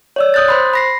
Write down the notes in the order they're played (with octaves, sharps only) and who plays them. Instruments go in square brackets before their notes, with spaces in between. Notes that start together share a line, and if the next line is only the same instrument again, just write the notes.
[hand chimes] C#5 D5 E6
D#6 F#6 G6 A6
C5 B5 C6
B5 A#6 C7